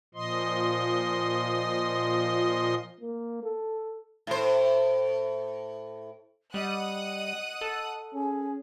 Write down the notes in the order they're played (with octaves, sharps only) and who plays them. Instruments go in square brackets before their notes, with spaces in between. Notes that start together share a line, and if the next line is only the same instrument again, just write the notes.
[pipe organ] A#2 F3 D#5 C6
[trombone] A#3
A4
[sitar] A2 C5
[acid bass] G3 [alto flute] D#5 [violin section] F#5 D#6 F#6
[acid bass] A4
[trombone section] C#4 G#4 [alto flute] G#5